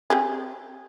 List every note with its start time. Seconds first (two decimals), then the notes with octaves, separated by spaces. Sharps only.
0.10 C4 G4 G#4